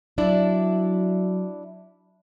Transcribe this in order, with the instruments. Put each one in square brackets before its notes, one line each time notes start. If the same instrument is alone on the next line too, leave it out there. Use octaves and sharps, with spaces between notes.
[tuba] F#3 [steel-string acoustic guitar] D4 E4 D5